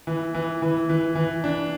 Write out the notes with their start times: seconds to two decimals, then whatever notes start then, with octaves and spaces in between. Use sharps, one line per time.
0.07 E3
0.35 E3
0.62 E3
0.89 E3
1.15 E3
1.44 D4